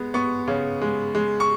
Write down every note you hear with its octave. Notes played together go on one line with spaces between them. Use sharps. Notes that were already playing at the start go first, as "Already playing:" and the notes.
Already playing: G#3 B3
B3 C#6
C#3
G#3
G#3
C#6